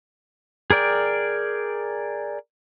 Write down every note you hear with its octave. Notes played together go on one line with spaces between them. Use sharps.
G#4 A#4 D5 G5